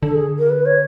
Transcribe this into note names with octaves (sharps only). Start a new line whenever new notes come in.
D3 A4
G#4
A#4
B4
C#5